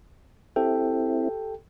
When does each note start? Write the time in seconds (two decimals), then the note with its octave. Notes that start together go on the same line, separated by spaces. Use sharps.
0.56 C4 E4 G4 A4 G5